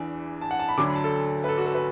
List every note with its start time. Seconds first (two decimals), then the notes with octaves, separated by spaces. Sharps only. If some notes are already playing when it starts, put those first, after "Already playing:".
Already playing: E2 E3 D4
0.41 A5
0.51 F#5
0.59 A5
0.69 B5
0.77 D2 D3 F#3 D4 D6
0.86 B5
0.96 A5
1.04 A4
1.44 B4
1.49 A4
1.58 F#4
1.66 A4
1.75 B4